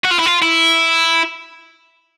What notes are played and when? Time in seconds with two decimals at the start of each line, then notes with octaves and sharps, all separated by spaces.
0.05 F#4
0.12 F4
0.20 E4
0.26 F4
0.42 E4